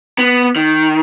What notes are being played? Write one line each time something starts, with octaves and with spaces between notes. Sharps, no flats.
B3
D#3